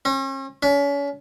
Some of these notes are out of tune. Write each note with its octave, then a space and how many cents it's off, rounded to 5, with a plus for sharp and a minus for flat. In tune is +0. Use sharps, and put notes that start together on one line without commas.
C#4 -45
C#4 +35